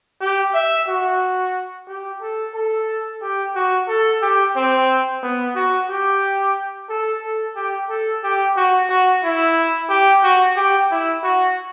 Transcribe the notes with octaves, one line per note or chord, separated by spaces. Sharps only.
G4
E5
F#4
G4
A4
A4
G4
F#4
A4
G4
C4
B3
F#4
G4
A4
A4
G4
A4
G4
F#4
F#4
E4
G4
F#4
G4
E4
F#4